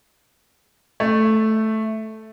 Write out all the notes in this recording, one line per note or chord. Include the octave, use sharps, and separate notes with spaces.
A3